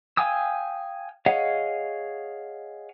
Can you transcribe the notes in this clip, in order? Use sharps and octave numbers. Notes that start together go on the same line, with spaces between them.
F5 G5 G#5 D#6 E6
G#4 C#5 D#5 F5 F#5